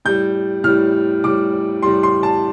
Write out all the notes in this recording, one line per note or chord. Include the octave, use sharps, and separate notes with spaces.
A2 G3 G6
A2 G3 F6
A2 G3 D6
A2 G3 C6
C6
A5